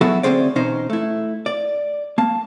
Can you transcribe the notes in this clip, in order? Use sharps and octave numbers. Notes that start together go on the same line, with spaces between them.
F#3 B3 E4 F#4 G#4 A4
D2 C4 C#4 G#4 C5 D5
E2 B2 C#4 D#4 C5
A3 E4
D5
A#3 A5